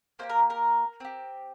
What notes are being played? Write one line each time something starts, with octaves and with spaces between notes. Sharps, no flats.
A#3 D#4 G4 C5
A#4
A#4
C4 G4